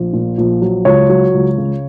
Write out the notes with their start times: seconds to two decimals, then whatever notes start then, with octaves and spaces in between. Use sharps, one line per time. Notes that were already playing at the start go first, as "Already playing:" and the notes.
Already playing: A#1
0.13 A#2
0.38 A#1
0.62 F#3
0.85 C#2 C#5
1.09 F#3
1.34 C#2
1.58 C#3